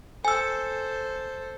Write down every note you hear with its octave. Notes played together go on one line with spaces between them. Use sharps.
A4 C5 G#5 E6